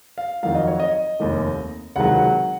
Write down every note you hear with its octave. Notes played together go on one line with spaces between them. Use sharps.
F5
F2 D#3 F#3 F5
D#5
C#5
D#5
F1 D#2 D#3
C#2 C3 D#3 F#3 F#5